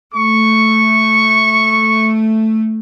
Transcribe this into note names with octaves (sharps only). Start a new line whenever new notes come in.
A3 C#6